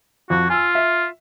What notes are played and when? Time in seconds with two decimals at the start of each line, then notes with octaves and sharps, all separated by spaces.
0.30 F2 F#4
0.50 F4 G#5 E6
0.75 E5